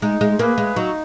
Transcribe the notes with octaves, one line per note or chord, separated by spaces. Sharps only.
G#3 D#4
G#3
A#3 G#4 B4
G#3
F#3 D#4